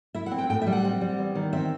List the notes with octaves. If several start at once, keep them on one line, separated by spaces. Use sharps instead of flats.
E4 E5
F#5
C4
G5
A2 G5
E5
G3
F#5
C4
G3
E2
D#3
C4 E5